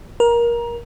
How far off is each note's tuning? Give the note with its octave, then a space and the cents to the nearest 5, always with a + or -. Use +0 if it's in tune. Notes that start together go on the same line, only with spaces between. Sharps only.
A#4 +20